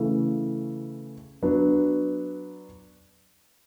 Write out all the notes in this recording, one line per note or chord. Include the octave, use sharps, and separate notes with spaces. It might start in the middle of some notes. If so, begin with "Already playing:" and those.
Already playing: C#3 E3 A3
F#3 B3 D4